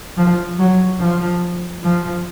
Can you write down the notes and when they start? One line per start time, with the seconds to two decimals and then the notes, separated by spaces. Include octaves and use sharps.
0.17 F3
0.59 F#3
1.00 F3
1.83 F3